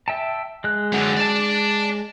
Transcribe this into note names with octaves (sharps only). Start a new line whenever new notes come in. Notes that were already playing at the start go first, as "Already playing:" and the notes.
E5 G5 A5
G#3 F#6
F#2 D3
D5 A5